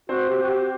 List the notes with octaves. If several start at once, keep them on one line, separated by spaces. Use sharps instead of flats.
C4 F#4 C5
G4
F#4
G4